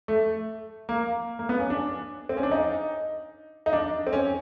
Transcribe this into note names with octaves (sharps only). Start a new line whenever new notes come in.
A3
A#3
A#3
B3
C#4
D4
C4
C#4
D4
D#4
D#4
D4
C4
C#4